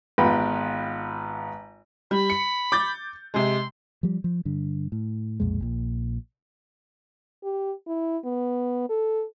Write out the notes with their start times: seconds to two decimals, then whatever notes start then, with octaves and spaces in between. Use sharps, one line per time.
0.18 G#1 B3 F4 B4 G5 B5
2.11 G3 B5
2.30 C#7
2.72 D6 G6 A6
3.34 C3 G#3 C6
4.03 F3 G3
4.24 F3
4.45 G2 D3
4.92 A2
5.40 B1 F2 A#2 G#3
5.60 A#1 A#2
7.44 G4
7.87 E4
8.25 B3
8.90 A4